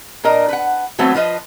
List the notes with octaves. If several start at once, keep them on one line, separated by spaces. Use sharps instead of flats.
A#2 D4 A#4 D#5
B4 F#5
E3 F#3 A3 B3 C4
F3 F4 B4 D#5